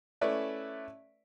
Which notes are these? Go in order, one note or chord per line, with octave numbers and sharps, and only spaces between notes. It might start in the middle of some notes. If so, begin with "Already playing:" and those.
A3 C#4 E4 B4 D5 E5